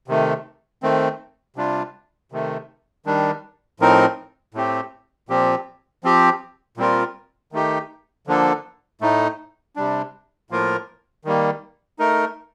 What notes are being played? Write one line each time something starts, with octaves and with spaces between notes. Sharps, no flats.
C3 D#3 A3
D#3 A3 C4
C3 G3 D4 F4
C3 D#3 A3
D#3 G3 D4
A2 F3 C4 D#4 A#4
A2 A3 C4 G4
A#2 F3 C4 G4
F3 C4 G4
A#2 G3 C4 F4 A#4
D#3 A3 D#4 G4
D3 F3 A#3 D4 A4
A2 A3 D#4
C3 G3 D4
A2 F3 A#3 F4 A#4
D#3 G3 A#3
A3 D#4 A#4